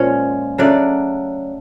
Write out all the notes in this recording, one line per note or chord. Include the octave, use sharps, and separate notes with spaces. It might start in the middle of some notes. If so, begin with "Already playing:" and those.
Already playing: A#2 F3 G#3 C#4 C#5
C#3 F#3 A3 D4 D5